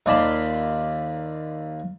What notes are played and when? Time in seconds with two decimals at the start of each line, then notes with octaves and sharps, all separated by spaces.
0.06 D#2 F4 D5 A5 B5 C6